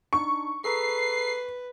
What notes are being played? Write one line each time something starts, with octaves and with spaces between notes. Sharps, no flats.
D4 D#4 C#6
G#4 A4 B4 A#5 C7